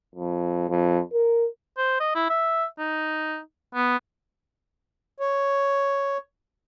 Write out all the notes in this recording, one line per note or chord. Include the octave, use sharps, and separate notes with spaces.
F2
F2
A#4
C5
D#5
E4
E5
D#4
B3
C#5